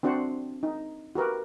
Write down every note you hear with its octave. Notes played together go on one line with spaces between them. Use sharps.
C4 D4 F#4 C5 F#5
D#4
F#4 G4 A#4 B4